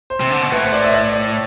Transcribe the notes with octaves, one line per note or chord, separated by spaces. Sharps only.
C5
C3
D3
B2
A2 B4
C5
D5
E5
D5